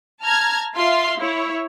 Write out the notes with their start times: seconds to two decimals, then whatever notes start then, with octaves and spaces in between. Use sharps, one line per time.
0.24 A5 A#5 F6 G#6
0.75 F4 E5 F5 C6
1.18 E4 C#5